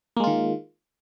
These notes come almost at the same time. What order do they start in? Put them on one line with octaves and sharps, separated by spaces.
A#3 G#3 F4 D#3